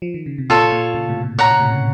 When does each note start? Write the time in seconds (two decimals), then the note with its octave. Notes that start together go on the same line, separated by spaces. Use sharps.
0.02 F3
0.14 D#3
0.26 C#3
0.38 C3
0.50 A#2 F4 A4 C#5
0.72 A#2
0.94 A#2 C#3
1.09 A2 C3
1.23 A#2
1.38 A#2 C#5 F#5 A#5
1.51 C#3
1.60 A2 C3
1.72 C#3